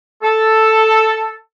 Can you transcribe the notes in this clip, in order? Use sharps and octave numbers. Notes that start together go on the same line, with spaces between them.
A4